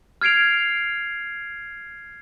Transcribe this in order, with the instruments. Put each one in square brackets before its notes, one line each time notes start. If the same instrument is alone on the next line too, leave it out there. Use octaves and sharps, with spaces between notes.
[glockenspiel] F6 G#6 C7 D7 F7